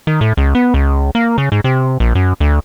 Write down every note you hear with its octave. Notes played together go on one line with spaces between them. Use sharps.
D#3
A2
C#2
B3
C#2
A#3
C#3
G#2
C3
A#1
F#2
D2